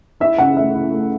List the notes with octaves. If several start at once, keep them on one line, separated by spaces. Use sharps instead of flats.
E4 E5
C#3 F#5
A3 E5
E4
A3